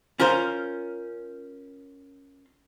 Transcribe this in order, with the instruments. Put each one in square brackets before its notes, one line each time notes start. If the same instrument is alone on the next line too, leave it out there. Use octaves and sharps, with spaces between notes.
[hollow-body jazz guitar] C#4 F4 A#4 C5